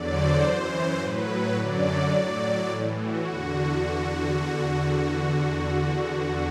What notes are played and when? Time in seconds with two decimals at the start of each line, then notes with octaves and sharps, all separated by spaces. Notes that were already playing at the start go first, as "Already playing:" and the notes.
Already playing: E2 D3 F#3 D5
0.15 C5
0.43 F#2 E3
0.99 A2 F#3 B4
1.27 B4
1.55 F#2 D3 F#3 D5
2.12 A2 F#3 D5
2.69 A2 E3
2.97 F#4
3.25 E2 D3 F#4